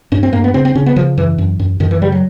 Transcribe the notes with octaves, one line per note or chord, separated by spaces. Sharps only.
G2 C#4
C4
G2 A#3
B3
C#3 C4
C4
C#3 C#4
B3
C#3 F3
F#2 E3
F#2
F#2
F#2 D#3
E3
C#3 G3
F#3